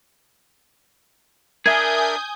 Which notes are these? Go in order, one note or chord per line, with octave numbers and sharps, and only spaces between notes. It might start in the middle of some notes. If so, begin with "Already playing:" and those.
D4 G#4 A#4 E5 G#5 D#6 G6 G#6